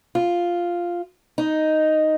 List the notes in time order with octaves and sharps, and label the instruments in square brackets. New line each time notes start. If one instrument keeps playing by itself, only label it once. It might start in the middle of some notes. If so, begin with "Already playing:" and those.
[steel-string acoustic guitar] F4
D#4